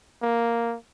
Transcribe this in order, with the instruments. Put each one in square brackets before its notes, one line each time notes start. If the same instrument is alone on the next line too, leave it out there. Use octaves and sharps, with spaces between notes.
[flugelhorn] A#3